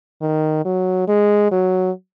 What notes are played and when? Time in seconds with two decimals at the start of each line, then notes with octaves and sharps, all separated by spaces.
0.21 D#3
0.65 F#3
1.08 G#3
1.52 F#3